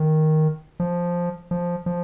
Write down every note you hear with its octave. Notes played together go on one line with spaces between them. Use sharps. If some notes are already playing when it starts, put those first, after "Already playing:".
Already playing: D#3
F3
F3
F3